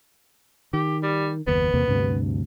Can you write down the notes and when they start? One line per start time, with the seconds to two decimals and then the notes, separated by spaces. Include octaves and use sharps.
0.73 D#3 G4
1.03 G3
1.47 F#1 D#2 B3
1.74 E2 C3 A#3
1.88 D2 G2 C3